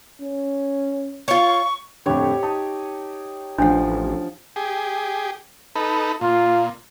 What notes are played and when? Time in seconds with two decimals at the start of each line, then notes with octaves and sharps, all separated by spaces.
0.22 C#4
1.28 F4 C#5 C#6
2.06 F2 A2 D3 G4 C#5
2.43 D#4 A5
3.58 A1 F3 D4 F#5
4.56 G4 G#4
5.76 D#4 A4 B4
6.21 A#2 F4